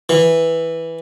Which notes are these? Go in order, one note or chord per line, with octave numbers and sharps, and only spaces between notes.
E3